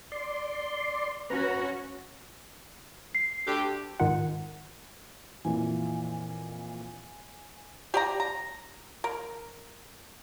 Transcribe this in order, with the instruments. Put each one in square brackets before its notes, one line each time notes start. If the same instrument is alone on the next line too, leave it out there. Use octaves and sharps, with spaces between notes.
[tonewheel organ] D5 C6
[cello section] C#4 F#4 [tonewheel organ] B4 A#5
[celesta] C7
[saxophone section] D2 D3 G4
[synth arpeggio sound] G#2 D#3 D#4 F4 F#5
[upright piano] F2 A#2 E3 [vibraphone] G#5
[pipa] G4 D5 A#5
A#5
A#4